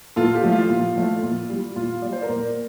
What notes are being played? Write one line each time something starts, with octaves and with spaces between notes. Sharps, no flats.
A#2 F4 A4
G4
F3 A3
F4
A#2
F3 A3
A#2
G3
A#2 F4
G3 D5
C5
A#4 D5
A#2